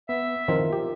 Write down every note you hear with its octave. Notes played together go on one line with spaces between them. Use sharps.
B3 E5
D#3 F3 C4 F4 A#4
G4